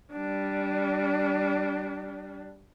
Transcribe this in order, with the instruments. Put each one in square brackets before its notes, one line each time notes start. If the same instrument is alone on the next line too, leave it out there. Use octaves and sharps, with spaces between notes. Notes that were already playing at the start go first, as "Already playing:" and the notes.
[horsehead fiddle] G3 D4